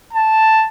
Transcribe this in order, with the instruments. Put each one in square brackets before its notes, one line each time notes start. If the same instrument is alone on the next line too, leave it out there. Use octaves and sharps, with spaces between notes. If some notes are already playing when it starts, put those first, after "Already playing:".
[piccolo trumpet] A5